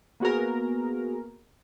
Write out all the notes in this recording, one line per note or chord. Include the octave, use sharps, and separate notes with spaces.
A#3 B3 F#4 G#4 A#4